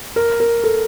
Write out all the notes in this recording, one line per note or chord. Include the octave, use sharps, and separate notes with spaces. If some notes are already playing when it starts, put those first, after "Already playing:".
A#4
A#4
A4